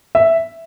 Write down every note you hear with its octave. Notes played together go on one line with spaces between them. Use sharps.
E5